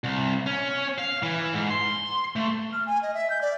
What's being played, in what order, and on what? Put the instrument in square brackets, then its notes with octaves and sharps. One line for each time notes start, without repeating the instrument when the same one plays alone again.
[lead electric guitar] C2
C#4
F5
E3
G#2
C6
A3
[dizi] F6
G#5
D#5
E5
G6
D5